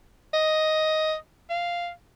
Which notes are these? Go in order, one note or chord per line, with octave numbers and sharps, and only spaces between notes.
D#5
F5